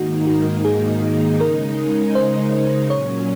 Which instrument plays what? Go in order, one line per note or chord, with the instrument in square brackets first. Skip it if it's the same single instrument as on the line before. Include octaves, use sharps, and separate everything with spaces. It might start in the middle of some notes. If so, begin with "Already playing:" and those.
Already playing: [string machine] G#2 D#3 A#3 D#4 [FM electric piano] F#4
[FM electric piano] F#4
G#4
[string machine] C#3 G#3 D#4 [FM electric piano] A#4
[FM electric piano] C5
[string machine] A#2 F#3 C#4 [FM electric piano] C#5